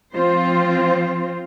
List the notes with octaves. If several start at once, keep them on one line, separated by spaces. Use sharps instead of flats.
F3 C4 F4 C5